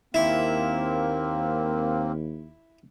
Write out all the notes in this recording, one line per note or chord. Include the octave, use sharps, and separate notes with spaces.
D#2 A#3 C4 E4